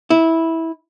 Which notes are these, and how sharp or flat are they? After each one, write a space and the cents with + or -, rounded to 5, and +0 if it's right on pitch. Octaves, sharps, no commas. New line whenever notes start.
E4 -15